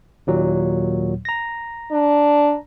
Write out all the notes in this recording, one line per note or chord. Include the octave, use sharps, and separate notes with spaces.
D#2 A#2 F#3
A#5 A#6
D4